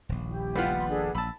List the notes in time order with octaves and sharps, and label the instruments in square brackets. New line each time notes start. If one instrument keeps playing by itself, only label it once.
[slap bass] D#1 A#1
[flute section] E4 G4
[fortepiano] G3 B3 F4 [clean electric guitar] B4 F#5
[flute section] B5 C6
D4 G#4 A4
[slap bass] A#1 [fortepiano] A5 B5 [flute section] E6